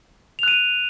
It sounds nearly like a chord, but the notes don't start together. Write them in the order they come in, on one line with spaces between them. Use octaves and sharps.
F7 F#6 D#7